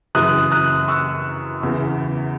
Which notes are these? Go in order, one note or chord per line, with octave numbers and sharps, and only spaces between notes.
F#2 C#3 E3 D#6 F#6
D#6 F#6
C#6 E6
E2 C#3 E3